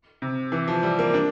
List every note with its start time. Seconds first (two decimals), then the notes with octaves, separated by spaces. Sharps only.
0.22 C3
0.52 E3
0.68 F3
0.83 G3
0.99 A#3
1.14 D4